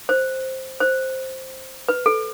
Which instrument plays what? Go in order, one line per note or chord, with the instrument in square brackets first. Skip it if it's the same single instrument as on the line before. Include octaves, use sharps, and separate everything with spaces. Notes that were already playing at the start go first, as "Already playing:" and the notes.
[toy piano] C5
C5
B4
A4